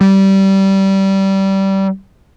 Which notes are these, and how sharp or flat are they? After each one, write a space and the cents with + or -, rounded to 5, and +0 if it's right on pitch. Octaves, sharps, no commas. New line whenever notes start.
G3 -20